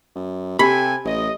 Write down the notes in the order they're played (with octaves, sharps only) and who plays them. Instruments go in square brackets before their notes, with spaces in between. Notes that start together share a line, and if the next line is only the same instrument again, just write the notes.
[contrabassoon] F#2
[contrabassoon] C3 [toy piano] G4 [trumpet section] A4 G5 G#5 [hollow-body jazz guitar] B5
[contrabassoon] A1 [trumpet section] D#5